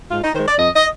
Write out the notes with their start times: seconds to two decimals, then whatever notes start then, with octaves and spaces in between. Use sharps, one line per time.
0.11 G#2 F4
0.23 D#4
0.34 D#3 C5
0.39 G#3
0.47 D5
0.58 F2 D#5
0.75 D#5